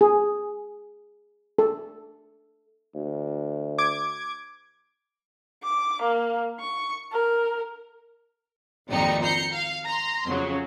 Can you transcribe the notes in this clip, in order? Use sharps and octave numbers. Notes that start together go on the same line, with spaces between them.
G#4
A4
D2
D6 G#6
D6
A#3
C#6
A#4
G#1 F2 A#2 G3 D#4 C#7
A#5 G6 C7 C#7
F5
A#5 C6
F2 C#3 F#3